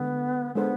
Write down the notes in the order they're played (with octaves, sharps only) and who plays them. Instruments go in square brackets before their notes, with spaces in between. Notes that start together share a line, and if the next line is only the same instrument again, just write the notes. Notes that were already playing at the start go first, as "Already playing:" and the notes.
Already playing: [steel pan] D3 G#3 D4 A4 [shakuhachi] B3
[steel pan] G#3 D4 A4 C5 [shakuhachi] B3